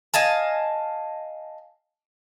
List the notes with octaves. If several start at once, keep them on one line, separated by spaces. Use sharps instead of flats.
D#5 F5 G#5 A5